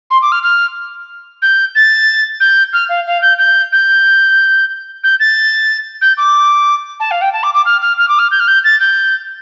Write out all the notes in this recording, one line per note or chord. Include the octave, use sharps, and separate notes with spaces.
C6
D6
F6
F6
G6
A6
G6
F6
F5
F5
G6
G6
G6
G6
A6
G6
D6
A5
F5
G5
A5
D6
D6
F6
F6
F6
D6
F6
G6
F6
G6
A6
G6